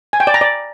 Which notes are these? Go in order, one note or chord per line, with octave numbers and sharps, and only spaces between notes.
G#5
G5
D5
A#5
D5